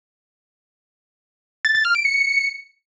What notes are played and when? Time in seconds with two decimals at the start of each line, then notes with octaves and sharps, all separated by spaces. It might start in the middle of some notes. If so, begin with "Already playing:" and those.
1.65 A6
1.75 A6
1.85 F6
1.95 D7
2.05 C#7